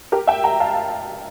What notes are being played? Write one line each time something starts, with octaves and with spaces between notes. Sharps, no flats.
G4 A#4
E5 G5
G5 A#5
F5 A5